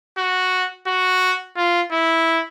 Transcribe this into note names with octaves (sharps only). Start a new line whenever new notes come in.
F#4
F#4
F4
E4